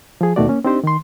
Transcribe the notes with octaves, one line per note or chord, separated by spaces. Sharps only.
F3 G#4
D#2 B2 D#3 A3 F#4 D5
A#3 C#4
C4 D4 D#4 G4 C5
D#3 C6